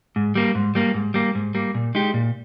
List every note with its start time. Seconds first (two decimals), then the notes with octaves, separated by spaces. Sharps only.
0.16 G#2
0.35 G3 A#3
0.55 G#2
0.75 G3 A#3
0.94 G#2
1.14 G3 A#3
1.35 G#2
1.55 G3 A#3
1.75 A#2
1.95 G#3 D#4 G4
2.14 A#2